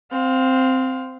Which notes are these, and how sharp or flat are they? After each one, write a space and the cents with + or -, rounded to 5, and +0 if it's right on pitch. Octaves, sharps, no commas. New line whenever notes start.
C4 -5 F5 +25